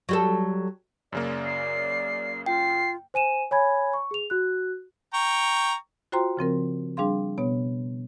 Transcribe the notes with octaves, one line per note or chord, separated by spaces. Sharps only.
F#3 G3 A4
F#2 C#3 A#3 D5
C7
F4 G5 C7
C5 G#5 D#7 E7
C#5 G#5 B5 G#6
C#6
G#4 F7
F#4 F#6
G5 A#5 C#6
F4 F#4 C5 G5 A#5 C6
C#3 F3 C4 A#4
G3 D4 G#4 F5 C6
B2 B3 C#5